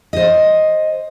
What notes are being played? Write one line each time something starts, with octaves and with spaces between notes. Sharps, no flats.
C5 D#5